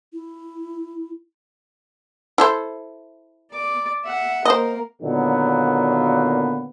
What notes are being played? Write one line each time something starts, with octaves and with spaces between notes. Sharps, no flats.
E4
E4 A4 C5
D5 D6
E5 F#5
A#3 A#4 C5 D#5
A#2 D3 D#3 F#3 A#3 B3